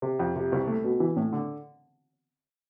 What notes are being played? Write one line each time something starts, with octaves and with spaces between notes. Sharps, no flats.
C3
F2
C3
C2
A3
B2
E3
A2
D3